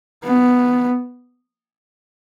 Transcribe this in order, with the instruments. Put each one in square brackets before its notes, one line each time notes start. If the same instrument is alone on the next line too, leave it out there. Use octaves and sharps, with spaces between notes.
[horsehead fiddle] B3